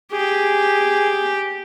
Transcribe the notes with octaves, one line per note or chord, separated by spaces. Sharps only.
G4 G#4